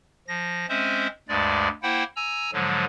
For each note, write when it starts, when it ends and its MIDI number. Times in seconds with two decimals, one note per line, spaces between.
0.28 0.66 53
0.28 0.66 94
0.69 1.07 56
0.69 1.07 60
0.69 1.07 61
0.69 1.07 72
0.69 1.07 76
1.28 1.68 38
1.28 1.68 43
1.28 1.68 56
1.28 1.68 74
1.83 2.04 58
1.83 2.04 64
1.83 2.04 72
1.83 2.04 78
1.83 2.04 79
2.16 2.50 80
2.16 2.50 82
2.16 2.50 88
2.53 2.85 44
2.53 2.85 50
2.53 2.85 53
2.53 2.85 54
2.53 2.85 56